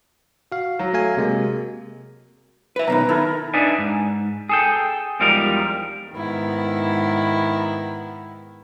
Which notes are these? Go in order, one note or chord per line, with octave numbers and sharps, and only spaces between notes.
F#4 F5
F#3
A3 F5 G#5
C3 G#3 A#3
B4 E5
B1 B2 D#3 B4 A#5
D#3 E4 A4 A#4
D4 D#4 B4 D5 E5 G#5
G#2
G#4 A4 G5
E2 F3 G3 G#3 D#4 A#4
G#2 D#3 B3 E4